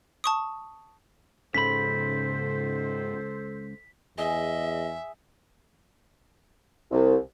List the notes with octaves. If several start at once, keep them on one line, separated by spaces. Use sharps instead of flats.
A5 C#6 D#6
C#2 G#2 C#3 C#4 A4 C5 B5 B6
E2 G#4 D#5 E5
C2